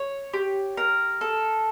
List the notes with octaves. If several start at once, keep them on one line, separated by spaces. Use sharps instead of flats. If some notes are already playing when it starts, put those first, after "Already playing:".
Already playing: C#5
G4
A#4
A4